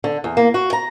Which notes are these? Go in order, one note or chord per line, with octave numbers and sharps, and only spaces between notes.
D3
E2
A#3
F#4
A#5